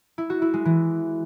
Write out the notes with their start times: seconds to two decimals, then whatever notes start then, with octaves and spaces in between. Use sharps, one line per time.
0.18 E4
0.30 F#4
0.42 E4
0.54 G#3
0.65 E3